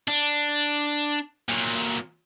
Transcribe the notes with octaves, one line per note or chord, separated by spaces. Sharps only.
D4
A#2 F#3